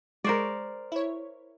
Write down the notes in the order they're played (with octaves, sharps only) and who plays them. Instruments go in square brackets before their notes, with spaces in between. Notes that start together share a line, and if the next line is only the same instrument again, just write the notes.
[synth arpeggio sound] G#3 C#6 [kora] A#4 C5 D5
[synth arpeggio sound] E4 C#5